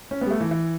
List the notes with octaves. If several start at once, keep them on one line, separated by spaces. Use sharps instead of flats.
C#4
G3 B3
A3
E3
E3